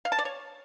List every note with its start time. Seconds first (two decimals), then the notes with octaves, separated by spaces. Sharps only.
0.05 F5
0.12 A5
0.19 D5
0.25 C#5